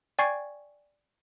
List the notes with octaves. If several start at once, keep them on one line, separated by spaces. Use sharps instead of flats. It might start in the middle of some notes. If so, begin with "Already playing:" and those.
D5 G5 G#5 C#6 G#6 C7